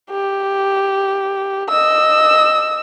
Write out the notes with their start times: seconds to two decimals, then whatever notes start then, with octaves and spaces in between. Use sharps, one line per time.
0.11 G4
1.70 D#5 E6